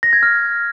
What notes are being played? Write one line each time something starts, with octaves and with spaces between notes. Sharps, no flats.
A#6
G#6
F6